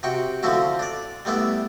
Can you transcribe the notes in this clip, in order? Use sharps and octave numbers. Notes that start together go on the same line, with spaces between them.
C3 F#4 G5 C#6
D3 F3 C4 C#4 E4 F#4
D4 D5
G3 A3 B3 D4 E4